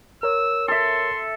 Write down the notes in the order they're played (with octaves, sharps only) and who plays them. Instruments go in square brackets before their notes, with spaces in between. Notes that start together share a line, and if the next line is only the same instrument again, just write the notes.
[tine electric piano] A#4 C#5 [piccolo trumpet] E6
[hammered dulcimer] A4 E5 [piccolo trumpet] C6